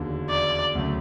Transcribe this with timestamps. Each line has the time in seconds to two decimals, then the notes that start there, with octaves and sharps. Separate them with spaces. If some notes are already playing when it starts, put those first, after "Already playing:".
Already playing: E1 D#2 D3
0.30 D5
0.75 D2 C#3 F#3 A3